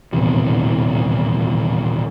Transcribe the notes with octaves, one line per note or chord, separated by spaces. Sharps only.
D#1 A1 E2 C3